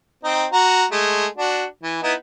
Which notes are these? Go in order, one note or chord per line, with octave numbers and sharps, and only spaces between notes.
C4 D#4
F#4 A#5
G#3 A3
D4 F#4
E3
B3 D#4 E4